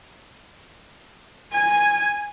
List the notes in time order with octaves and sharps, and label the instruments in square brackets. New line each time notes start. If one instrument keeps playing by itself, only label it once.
[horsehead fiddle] G#5